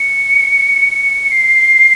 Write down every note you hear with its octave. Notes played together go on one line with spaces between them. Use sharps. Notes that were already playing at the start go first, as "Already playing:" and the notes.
Already playing: C#7
C7